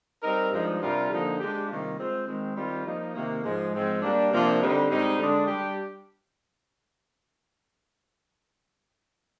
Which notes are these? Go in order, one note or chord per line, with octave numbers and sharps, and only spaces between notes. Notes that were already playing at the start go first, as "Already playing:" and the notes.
G3 C4 D#4 A#4
G2 F3 G#3 D#4
C3 G3 D4 F4 A#4
D3 F3 A#3 D#4
G#3 D4 G4
C3 D#3 G3 A#3 F4
G#3 C4 F4 C5
D#3 G#3 C4
D#3 G3 C4 F4 C5
F3 A#3 D#4
C3 D#3 A#3
G#2 F3 G#3
G#2 F3 G#3 C4
G3 A#3 D4
C3 F3 A#3 D4 F4
D3 G3 C4 D#4
G#2 G3 C4 D#4
D3 G#3 D4 G#4
G3 D4 G4